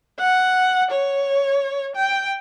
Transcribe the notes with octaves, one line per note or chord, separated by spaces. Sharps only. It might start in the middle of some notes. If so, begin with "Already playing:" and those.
F#5
C#5
G5